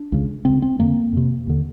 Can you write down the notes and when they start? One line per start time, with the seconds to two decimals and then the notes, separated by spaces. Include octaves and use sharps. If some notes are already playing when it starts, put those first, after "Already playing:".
Already playing: D4
0.12 C#2 C#3
0.45 C#2 C#3 C4
0.62 C4
0.79 F2 D3 A#3
1.13 F2 C3
1.47 D#2 D3